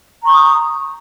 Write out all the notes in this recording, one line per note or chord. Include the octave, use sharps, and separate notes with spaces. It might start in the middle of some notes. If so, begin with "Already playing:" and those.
A#5 C#6 D#6 G6